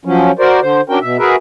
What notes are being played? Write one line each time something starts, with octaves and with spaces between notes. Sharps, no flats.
F3 F#3 C#4
F#4 A#4 C5 D5
D3 C5
C#4 D4 F#4 A#4 G5
B2 E5
F#4 G#4 A#4 B4 E5